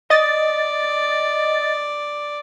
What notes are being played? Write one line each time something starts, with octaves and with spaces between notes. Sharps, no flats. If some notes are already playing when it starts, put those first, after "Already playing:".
D5 D#5 A6